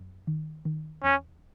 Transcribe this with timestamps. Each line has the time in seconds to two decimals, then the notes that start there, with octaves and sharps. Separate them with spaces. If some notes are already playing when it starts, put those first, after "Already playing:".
Already playing: F#2
0.27 D#3
0.65 D#3
1.03 E2 C#4